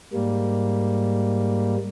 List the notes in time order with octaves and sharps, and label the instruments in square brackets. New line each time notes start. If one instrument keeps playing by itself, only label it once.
[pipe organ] G#2 G3 A#3